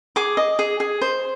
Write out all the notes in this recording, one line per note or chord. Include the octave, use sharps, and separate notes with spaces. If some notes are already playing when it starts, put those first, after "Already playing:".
G#4 D6
D#5
G#4
G#4
C5